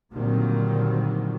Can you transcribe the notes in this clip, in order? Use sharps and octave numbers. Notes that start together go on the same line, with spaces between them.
A#2 D3 D#3 F#3 G3 C4